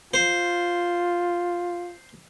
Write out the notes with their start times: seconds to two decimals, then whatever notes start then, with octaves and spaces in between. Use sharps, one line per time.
0.14 F4 C5